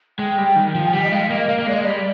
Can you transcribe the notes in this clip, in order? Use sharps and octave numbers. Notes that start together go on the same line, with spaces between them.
G#3 G5
G3
D#3
F3
G#5
G3 G5
D#5
G#3 F5
A#3 D#5
A#3 F5
A#3
G#3 D5
D#5
G3 D5